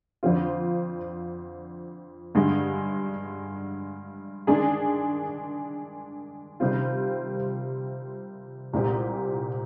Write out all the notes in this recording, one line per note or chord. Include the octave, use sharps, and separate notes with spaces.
F2 D3 F3 C4 F4
G2 D3 G#3
D#3 G#3 D4 G#4
C3 D#3 G3 C4 F4
C2 A#2 G#3 C4 G4